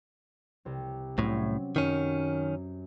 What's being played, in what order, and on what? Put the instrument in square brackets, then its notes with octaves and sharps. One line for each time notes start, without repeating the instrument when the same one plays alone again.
[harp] C2 C4
[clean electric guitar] C2 A2 [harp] F#3 C4 C#4
[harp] F#2 [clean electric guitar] D#3 C#4